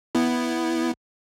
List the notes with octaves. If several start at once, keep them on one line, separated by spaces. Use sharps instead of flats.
B3 E4